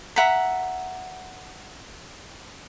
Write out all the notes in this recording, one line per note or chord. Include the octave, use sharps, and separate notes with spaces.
E5 F#5 A#5 B5